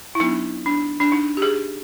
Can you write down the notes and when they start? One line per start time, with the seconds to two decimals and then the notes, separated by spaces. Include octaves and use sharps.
0.15 E4
0.20 F#3 B3 D4 D#4
0.66 D4
1.00 D4
1.12 D#4
1.37 G4
1.42 G#4